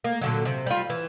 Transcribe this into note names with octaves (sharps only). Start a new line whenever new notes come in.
A#3
A#2 D3 F#3
C3
G3 F4
E3